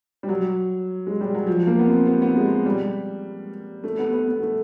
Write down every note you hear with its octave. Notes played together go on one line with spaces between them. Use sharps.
G3
F#3
G#3
G3
F#3
F3
A#3
B3
C4
B3
B3
G#3
G3
A3
B3
B3
B3
A3